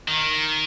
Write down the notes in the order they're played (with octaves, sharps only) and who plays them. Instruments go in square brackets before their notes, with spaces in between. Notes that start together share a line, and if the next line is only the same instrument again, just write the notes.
[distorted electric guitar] D#3